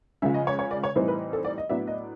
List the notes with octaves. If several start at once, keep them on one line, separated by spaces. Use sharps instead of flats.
C#3 F3 G#3 C#4 E5
D#5
C#5
C#5
D5
C#5
A2 E3 G3 C4 D#4 C5
B4
A4
D5
D#5
A2 F#3 B3 D4 E5
D#5